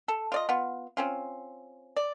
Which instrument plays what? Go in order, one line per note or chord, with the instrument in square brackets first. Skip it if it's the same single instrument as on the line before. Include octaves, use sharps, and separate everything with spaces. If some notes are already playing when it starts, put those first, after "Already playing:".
[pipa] A4
F4 D5 D#5
B3 F4
C4 C#4 F4
D5